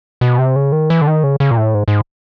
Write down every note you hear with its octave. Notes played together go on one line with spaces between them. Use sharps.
B2
C3
C#3
D#3
E3
D3
D#3
C#3
C#3
A#2
A2
G#2
G#2